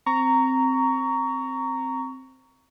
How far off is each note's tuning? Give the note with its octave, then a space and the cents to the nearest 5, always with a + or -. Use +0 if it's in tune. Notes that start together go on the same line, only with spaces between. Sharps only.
C4 +0 A#5 -10 C#6 +20